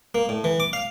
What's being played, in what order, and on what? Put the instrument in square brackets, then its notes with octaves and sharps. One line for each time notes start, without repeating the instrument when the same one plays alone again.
[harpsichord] A#3
A2
E3
D6
F5